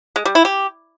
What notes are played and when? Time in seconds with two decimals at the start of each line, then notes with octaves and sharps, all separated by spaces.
0.16 G#3
0.25 G3
0.35 E4
0.45 G4